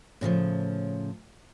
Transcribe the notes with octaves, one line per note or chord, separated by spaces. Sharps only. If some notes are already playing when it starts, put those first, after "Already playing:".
A2 C#3 E3 F3